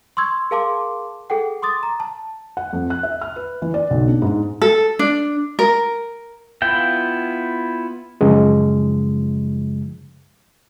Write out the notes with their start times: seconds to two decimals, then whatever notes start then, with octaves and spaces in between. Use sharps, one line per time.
0.17 C6 C#6 E6 G#6
0.51 G#4 A#4 F5 A5 C6 D6
1.30 G#4 A4 F#5 G5
1.62 C6 D6 D#6 A6
1.83 A#5
2.00 A5
2.57 F#5
2.73 F2
2.90 F#6
3.03 E5
3.22 F6
3.36 B4
3.62 E3
3.74 D5
3.90 B1
4.07 D4
4.22 G#2
4.62 A4
4.99 D4
5.59 A#4
6.62 B3 E4 F4 G5
8.21 F#2 C#3 F3 G#3